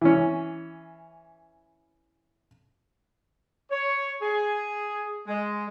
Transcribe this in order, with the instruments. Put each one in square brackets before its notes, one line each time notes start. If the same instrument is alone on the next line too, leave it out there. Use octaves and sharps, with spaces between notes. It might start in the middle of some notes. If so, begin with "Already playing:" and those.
[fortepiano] E3 C#4
[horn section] C#5
G#4
G#3